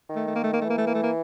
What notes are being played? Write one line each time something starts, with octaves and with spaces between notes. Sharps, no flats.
D#3
A3
A3
A#3
A3
A#3
E3 A3
A#3
A3
A#3
A3
A#3